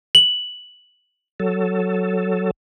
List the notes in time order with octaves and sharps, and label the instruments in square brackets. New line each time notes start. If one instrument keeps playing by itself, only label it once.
[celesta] F#7
[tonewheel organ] F#3 A4